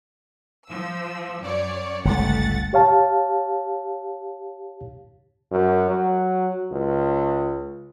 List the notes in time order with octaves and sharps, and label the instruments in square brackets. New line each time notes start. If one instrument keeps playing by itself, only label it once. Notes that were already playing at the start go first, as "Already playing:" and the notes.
[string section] F3 E6
F#2 C#5 D5
[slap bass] G1 C#2 [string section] A3 F#5 A6
[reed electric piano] G4 C#5 F5 A5
[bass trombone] F#2
F#3
C#2